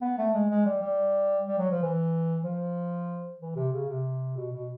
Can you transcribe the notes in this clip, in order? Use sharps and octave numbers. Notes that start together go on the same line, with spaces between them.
B3
A3
G#3
G#3
G3
G3
G3
F#3
F3
E3
F3
E3
C3
C#3
C3
B2
B2